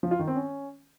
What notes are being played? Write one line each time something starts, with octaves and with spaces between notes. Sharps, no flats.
F3
F4
D#3
C4
C#4